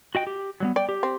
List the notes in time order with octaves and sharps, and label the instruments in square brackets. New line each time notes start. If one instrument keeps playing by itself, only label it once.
[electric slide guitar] F#4 D#5 G5
G4
F#3 G3 B3
[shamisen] D5 [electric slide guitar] G5
[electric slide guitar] G4
[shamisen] C4